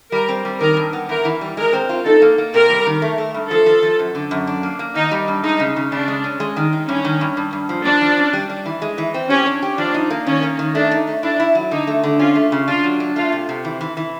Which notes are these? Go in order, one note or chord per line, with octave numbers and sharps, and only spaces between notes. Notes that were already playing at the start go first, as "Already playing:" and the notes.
G3 A#4
C4
G3
D#3 A#4
G2
B3
E2 A#4
E3
G3
G#3 A#4
C4
F4
D#4 A4
A#3
A#3
C3 A#4
G3
D#3
A3
A3
G2
F3 A4
F3
F3
F#2
D3
F#2
D4
A#3
A#3
D#3 D#4
G3
G2
G#3 D#4
C#3
C#3
C#3 D4
G#3
C#4
G#3
D#3
D#4
G2 C#4
D#3
G2
G2
G2
F3
F3 D4
F3
C#4
G3
G3
E3
G#3
E3
C4
C#4 G4
D4
G4
F3 D4
D#4
A#3
D#3 C#4
A#3
D#3
A3 D4
D#4
A3
D4 E4
E4
F#3
D3 D#4
A3
D3
C#4 F4
A3
C#3
D4 F4
F#3
D4
A3 F4
C3
C3
E3
E3
E3